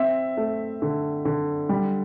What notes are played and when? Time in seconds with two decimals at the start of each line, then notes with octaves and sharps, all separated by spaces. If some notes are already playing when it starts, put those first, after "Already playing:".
Already playing: C4 E5
0.37 A3
0.82 D3
1.25 D3
1.69 G3